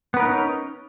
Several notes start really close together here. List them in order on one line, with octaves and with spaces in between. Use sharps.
B3 B4 A#4 D#4 C#4